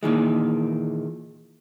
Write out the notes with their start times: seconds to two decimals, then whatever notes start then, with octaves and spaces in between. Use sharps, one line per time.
0.03 A#2 D#3 E3 G#3